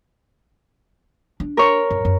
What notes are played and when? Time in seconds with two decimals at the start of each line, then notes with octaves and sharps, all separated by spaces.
1.40 D4
1.57 A#4 C#5
1.91 F#2
2.05 F#2